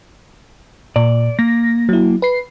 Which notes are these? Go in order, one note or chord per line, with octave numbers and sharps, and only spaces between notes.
A#2 D5
A#3 A#6
F#3 E4
B4 C7